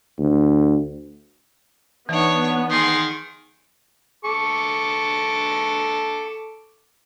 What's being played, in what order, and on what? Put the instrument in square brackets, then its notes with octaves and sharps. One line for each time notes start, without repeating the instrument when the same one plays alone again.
[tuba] D2
[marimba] E3 D#4 [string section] B3 [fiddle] D4 C#5
[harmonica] D#3 [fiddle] G#4 C6
[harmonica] A4 C#6 D6